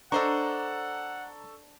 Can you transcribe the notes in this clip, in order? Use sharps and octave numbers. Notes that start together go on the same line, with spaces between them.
D4 A4 C5 D#5 F#5 A#5 C#6